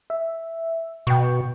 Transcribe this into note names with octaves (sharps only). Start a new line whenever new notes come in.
E5
B2 G5 C#6